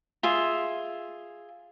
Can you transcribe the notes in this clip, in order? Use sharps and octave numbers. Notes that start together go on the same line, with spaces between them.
F4 G#4 E5